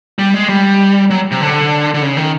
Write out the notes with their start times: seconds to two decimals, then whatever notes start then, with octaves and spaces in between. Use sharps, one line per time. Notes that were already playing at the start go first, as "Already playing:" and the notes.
0.19 G3
0.34 G#3
0.49 G3
1.10 F#3
1.31 C3
1.41 D3
1.94 D3
2.02 C#3
2.17 D#3